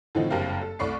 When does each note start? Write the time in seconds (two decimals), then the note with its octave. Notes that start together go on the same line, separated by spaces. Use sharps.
0.15 A2 D3 E3 F3 C4 D#4
0.30 F#1 G2 C4 G4 A#4 F5
0.61 A4
0.79 C2 A3 D5 B5 C#6 C7